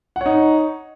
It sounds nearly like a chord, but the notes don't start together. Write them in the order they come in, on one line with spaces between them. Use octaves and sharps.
F#5 C#5 D#4